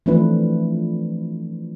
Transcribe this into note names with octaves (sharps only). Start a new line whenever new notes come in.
E3 F3 A3 C4 D4 B4